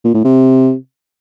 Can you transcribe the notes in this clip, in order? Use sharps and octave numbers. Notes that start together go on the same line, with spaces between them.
A#2
A2
C3